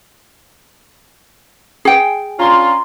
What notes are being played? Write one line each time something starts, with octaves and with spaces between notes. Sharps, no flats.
G#4 G5
C#4 D4 F4 A#5 C6